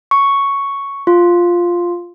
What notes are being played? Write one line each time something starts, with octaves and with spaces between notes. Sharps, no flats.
C#6
F4